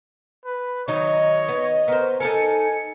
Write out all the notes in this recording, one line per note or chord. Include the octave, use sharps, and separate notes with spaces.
B4
D#3 F#3 D#4 C#5 D#5
B3
B3 A#4 C5
D#4 A4 A#4 G#5 C#7